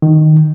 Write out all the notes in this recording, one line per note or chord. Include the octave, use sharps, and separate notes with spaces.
D#3